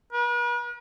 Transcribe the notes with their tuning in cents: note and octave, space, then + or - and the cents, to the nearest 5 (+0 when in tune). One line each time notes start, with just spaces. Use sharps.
B4 -45